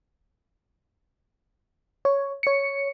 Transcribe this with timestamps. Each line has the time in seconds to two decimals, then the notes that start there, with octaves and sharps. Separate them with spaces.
2.05 C#5
2.43 C#5 C#7